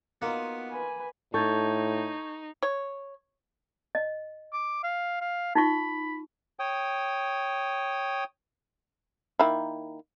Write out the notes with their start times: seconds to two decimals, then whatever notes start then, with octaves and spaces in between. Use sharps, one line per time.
0.22 A#3 B3 D#4 F4 F#4
0.71 B4 G#5
1.34 A2 D#4 A4 C#6 G6 G#6
2.63 C#5
3.95 D#5
4.53 D6
4.83 F5
5.21 F5
5.55 D#4 F4 B5 C#6
6.59 C#5 G5 D#6
9.39 D#3 A#3 E4